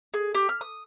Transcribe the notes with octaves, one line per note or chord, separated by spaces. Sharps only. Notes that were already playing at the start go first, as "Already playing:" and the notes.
G#4
G4
F6
D#6